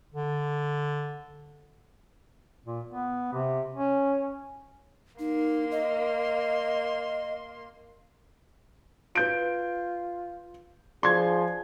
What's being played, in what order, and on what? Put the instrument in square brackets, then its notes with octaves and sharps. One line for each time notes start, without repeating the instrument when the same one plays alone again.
[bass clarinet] D3
[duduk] A#2
B3
C3
C#4
[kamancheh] A#3 C6 [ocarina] D#4
[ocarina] D#5
[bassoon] F4 [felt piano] B4 G6 D7
[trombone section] F3 G#4 [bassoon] D4 [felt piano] C6 G#6